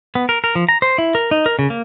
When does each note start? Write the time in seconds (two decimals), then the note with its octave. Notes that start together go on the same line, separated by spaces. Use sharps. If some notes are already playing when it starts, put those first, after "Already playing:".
0.15 B3
0.29 A#4
0.44 A#4
0.55 F3
0.69 A#5
0.82 C5
0.98 E4
1.15 A#4
1.31 D#4
1.46 A#4
1.59 C#3
1.70 A#3